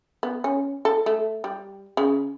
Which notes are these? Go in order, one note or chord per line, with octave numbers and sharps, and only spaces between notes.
B3
C#4
A4
A3
G3
C#3